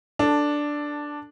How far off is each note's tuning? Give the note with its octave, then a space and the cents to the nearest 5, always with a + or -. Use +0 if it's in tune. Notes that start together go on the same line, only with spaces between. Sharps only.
D4 +0 A4 +10